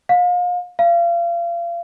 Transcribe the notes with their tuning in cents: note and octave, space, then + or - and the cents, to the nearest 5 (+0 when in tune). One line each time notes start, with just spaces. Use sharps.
F5 +35
F5 -30